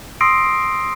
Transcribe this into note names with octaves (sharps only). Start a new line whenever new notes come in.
C6 D#6 E6 A#6 C7 D7